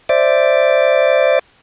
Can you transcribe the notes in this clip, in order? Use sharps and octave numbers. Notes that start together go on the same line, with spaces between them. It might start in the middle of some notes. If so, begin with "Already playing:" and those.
C5 D5 E5 D6